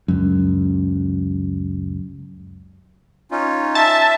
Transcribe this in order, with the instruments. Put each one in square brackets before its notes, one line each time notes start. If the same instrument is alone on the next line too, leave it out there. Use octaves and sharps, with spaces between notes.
[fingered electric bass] C#2 F#2
[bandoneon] C#4 D#4 F4
[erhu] E5 [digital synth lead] A5